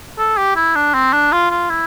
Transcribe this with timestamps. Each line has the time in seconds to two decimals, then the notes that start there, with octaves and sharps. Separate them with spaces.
0.18 A4
0.37 G4
0.56 E4
0.75 D4
0.94 C4
1.13 D4
1.32 F4
1.50 F4
1.69 E4